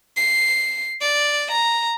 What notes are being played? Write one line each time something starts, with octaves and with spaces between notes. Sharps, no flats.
C7
D5
A#5